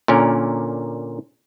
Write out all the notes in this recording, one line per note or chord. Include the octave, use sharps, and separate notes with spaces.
A#2 D3 C#4 A#4